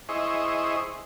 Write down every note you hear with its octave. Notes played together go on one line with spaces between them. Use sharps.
E4 G#4 C5 D#5 C#6